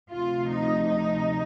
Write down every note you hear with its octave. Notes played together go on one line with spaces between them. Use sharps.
D2 C3 F3 F4
D#4
D#4